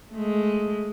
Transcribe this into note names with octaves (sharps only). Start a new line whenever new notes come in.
G#3 A3